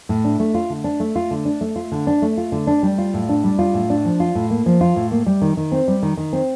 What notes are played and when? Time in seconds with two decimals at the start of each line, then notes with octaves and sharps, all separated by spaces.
0.09 A2
0.25 D4
0.40 A3
0.55 F4
0.70 D3
0.84 D4
1.00 A3
1.16 F4
1.31 D3
1.45 D4
1.61 A3
1.76 F4
1.92 D3
2.07 D4
2.22 A3
2.37 F4
2.52 D3
2.67 D4
2.83 G3
2.98 F4
3.14 A2
3.29 D4
3.44 G3
3.59 F4
3.74 A2
3.90 D4
4.05 F3
4.20 F4
4.35 A2
4.50 A#3
4.66 F3
4.81 F4
4.96 A2
5.11 A#3
5.26 G3
5.42 D#3
5.57 D#3
5.72 C4
5.88 G3
6.03 D#3
6.17 D#3
6.33 C4